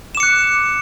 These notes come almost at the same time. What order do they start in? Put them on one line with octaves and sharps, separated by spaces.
E7 D6 C#7 F#6